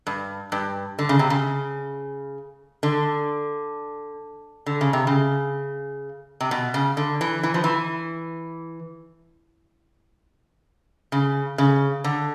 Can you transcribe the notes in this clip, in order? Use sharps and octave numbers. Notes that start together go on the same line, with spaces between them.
G2
G2
D3
C#3
C3
C#3
D3
D3
C#3
C3
C#3
C3
B2
C#3
D3
E3
E3
F3
E3
C#3
C#3
D3